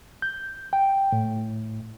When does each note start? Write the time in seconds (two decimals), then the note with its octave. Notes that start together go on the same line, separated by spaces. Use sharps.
0.22 G6
0.73 G5
1.12 A2